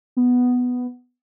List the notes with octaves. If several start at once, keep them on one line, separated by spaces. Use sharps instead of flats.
B3